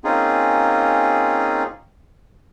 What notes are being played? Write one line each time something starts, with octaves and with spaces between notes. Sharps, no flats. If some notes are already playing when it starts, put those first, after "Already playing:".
A#3 C4 C#4 D#4 F4 G#4